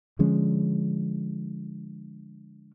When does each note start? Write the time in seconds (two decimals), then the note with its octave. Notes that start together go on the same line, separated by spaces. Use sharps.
0.19 D3 F3 G#3 C#4